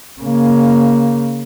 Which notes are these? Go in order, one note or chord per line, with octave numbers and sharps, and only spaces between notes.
C#3 A#3